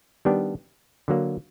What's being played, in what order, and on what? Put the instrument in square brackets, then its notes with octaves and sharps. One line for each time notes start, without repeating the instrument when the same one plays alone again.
[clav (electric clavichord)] D#3 G3 B3 D4 G4
D3 F#3 A#3